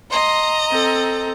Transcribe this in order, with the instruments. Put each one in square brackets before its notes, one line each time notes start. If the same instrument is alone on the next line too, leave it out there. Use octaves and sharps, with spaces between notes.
[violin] D#5 A#5 [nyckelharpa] C6
[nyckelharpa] C4 A4